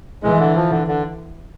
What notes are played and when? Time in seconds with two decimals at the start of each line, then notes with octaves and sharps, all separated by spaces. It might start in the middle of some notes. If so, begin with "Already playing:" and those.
0.23 E3 G#3
0.39 D3
0.55 F3
0.70 D3
0.87 D3